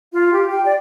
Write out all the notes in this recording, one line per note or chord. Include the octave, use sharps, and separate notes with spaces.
F4
G4
G5
D5